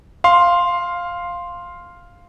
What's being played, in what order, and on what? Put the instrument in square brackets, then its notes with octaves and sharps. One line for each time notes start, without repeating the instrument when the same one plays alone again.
[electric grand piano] F5 C6